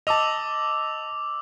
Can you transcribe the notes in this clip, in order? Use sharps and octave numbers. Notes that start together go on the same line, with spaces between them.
D#5 A5 D6 E6 F7